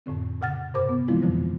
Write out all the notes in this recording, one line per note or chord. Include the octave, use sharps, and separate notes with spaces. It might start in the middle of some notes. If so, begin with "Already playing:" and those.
F2 A2 D3 C4
A#2 C#3 F#5 F6 A6
G2 C3 A#4 C5 A5 D6
B3
E3 F3 G#3 C4 E4 F4
F2 B2 D3 E3 F3 G3